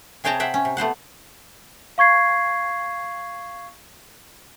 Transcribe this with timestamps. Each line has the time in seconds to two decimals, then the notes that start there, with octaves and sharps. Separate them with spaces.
0.24 C3 G#4 C#5 G5 A5 A#5
0.40 C5 E5 F#5 G5
0.54 C#4
0.65 C3
0.77 A3 B3 C5 F#5
1.98 F5 C#6 G#6 C7